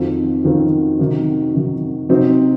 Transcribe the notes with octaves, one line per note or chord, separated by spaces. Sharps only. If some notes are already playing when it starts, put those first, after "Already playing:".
Already playing: F2 D#3 F#3 C4 F4
F2 D#3 F#3 C4 F4
C3 D#3 F#3
C3 D#3 F#3
C3 F#3 C4 D#4 F#4